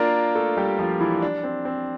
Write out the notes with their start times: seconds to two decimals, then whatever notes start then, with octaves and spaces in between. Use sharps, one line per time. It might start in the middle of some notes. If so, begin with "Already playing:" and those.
Already playing: A#3 D4 F4 A#4 D5 F5
0.35 A3 A4
0.57 G3 G4
0.79 F3 F4
1.00 E3 E4
1.22 D4
1.44 C4
1.65 C4